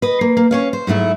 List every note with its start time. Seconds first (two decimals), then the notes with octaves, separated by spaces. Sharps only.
0.02 B4 D#5
0.21 A#3
0.37 A#3
0.51 C#4 C#5 F5
0.73 C5
0.87 G#2 F#3 A3 E4